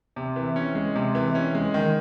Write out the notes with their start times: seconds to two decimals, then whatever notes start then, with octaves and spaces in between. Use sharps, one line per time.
0.16 C3
0.36 E3
0.56 C#4
0.75 G#3
0.95 C3
1.15 E3
1.35 C#4
1.55 G#3
1.74 D#3